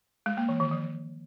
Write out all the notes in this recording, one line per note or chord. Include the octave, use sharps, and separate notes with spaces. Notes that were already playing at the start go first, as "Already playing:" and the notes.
G#3
A#3
E3
D#3
F3